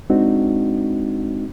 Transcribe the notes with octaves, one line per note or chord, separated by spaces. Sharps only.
G#3 C4 D4 D#4 F#4